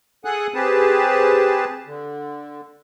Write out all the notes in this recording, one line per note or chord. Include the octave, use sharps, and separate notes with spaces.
G#4 A4 F#5 G#5 D#6 F#6
C4 G4 G#4 B4 A5
D3